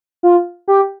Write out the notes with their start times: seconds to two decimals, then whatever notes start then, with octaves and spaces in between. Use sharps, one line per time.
0.23 F4
0.68 G4